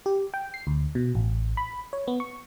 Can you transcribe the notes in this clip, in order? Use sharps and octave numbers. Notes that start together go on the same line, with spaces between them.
G4
G5
C7
D2
B2
A1
B5
C#5
B3
C#6